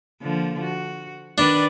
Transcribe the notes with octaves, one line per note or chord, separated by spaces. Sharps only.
D3 F3 A#3
F#4
D#3 D4 B4 D5